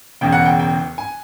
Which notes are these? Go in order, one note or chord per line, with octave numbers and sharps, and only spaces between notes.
E1 E2 C#3 G5
F#5
G5
G5
G#5